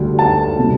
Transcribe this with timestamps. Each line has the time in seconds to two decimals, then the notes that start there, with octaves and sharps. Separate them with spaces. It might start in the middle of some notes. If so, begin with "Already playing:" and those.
Already playing: D2 D3 G3 D4
0.19 A5
0.59 C3 G3